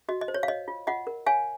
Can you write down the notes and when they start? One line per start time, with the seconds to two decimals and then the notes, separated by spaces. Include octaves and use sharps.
0.09 F#4 D#5
0.21 D#5
0.28 C5
0.34 C#5
0.43 F5
0.48 C#5 D#5
0.68 F4
0.87 F4 D#5 F#5
1.07 A#4
1.26 C#5 F5 G#5